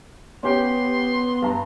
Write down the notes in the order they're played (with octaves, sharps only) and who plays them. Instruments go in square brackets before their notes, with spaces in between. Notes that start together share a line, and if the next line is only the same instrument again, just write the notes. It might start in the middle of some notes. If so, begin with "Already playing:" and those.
[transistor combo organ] B3 [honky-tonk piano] C#4 G4 G5 [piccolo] C6
[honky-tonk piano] G2 A#5